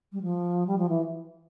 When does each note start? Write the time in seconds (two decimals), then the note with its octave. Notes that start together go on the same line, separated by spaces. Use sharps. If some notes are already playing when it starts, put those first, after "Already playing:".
0.12 G3
0.22 F3
0.66 G3
0.78 F3
0.89 E3